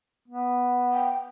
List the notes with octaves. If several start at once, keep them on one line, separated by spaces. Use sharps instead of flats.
B3
G5